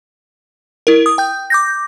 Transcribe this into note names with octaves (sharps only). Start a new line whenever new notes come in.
E4 A#4
D#6
G5 G6
D6 G6 A#6